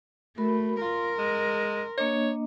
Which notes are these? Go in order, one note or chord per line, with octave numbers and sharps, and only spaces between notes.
A3 F#4 A#4 B5
F4 A#4 C6
G#3
A#3 D4 C#5 D#5